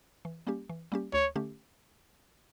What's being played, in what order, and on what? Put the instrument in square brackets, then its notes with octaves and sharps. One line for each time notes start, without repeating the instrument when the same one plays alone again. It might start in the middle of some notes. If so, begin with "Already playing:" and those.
[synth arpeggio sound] E3
G3 A#3 C#4 G4
E3
G3 A#3 C#4 G4
[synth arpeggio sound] D2 [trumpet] C#5
[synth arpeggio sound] D3 A3 C#4 G4